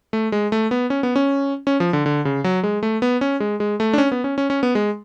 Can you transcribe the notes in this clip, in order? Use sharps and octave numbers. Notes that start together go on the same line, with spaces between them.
A3
G#3
A3
B3
C#4
B3
C#4
C#4
F3
D3
D3
C#3
F#3
G#3
A3
B3
C#4
G#3
G#3
A3
D4
C#4
B3
C#4
C#4
C#4
B3
G#3